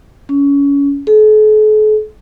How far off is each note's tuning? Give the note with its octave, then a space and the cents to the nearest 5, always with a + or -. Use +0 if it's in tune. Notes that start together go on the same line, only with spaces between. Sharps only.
C#4 +25
A4 -45